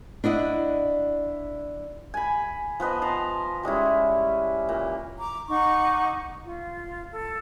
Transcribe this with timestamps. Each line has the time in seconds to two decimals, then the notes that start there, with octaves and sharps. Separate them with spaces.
0.24 D4 E4 D#5 F#5
2.14 G#5 B5
2.80 F3 B3 B4 D#5
3.02 A5 A#5 C6
3.63 G3 G#3 C#4 E4
4.69 A#2
5.19 A#5 D6
5.49 D#4 F#5 C#6 D6
6.45 F4
7.12 A4